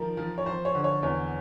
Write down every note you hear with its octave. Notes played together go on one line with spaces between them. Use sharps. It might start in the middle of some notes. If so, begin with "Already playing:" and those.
Already playing: D#3 F3 A#4
F3
C#5
F3 C5
C#5
D3
C#5
E2 C#5